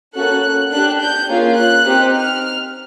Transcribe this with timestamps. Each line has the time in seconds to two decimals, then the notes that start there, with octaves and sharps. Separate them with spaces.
0.15 A#3 C#4 F#4 A4 F#6
0.72 D4 G4 F#6
1.00 G6
1.29 A#3 C#4 F4 G#4
1.56 F#6
1.85 C4 D#4 G4
2.13 F6